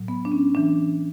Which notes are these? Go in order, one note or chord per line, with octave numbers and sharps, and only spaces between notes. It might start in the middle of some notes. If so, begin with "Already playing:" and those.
Already playing: A2 F#3
B3
D4
C#4
E3 D4